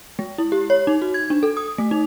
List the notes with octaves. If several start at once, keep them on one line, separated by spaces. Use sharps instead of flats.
G#3
E4
G4
C#5
D#4
F#4
G#6
D4
A4
D#6
A3
D#4